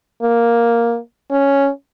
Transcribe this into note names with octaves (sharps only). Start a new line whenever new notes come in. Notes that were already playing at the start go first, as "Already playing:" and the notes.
A#3
C#4